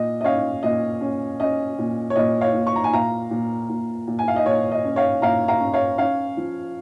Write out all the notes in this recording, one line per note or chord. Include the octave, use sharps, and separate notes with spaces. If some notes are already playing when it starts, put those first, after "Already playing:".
Already playing: A#2 D#5
D#5
C#4 C#5 F5
A#2 D#5
C#4
C#4 D#5
A#2
C#5
A#2 D#5
C#5 F5
A#2
C#6
A#5
G#5
A#2 F5 A#5
A#2
A#2
A#2
G#5
F5
D#5
A#2 C#5
D#5
C#4
C#5 F5
A#2 F5 A#5
F5 A#5
C#4
C#5 F5
C#4 C#5 F5
F3